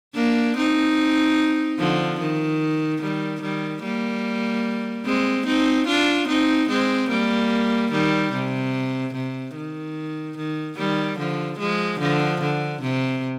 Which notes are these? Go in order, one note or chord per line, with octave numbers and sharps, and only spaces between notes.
A#3 D4
C4 D#4
D3 F3
D#3
D#3 G3
D#3 G3
G3 A#3
G#3 C4
C4 D#4
D4 F4
C4 D#4
G#3 C4
G3 A#3
D#3 G3
C3
C3
D#3
D#3
D#3 G3
D3 F3
F3 G#3
D3 F3
D3
C3